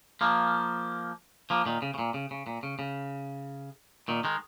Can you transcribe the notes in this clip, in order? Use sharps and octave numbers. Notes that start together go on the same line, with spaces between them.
F3 A#3
F3 A#3
A#2 D#3
C#3
C#3
A#2
C#3
C#3
A#2
C#3
C#3
A#2 D#3
D#3 G#3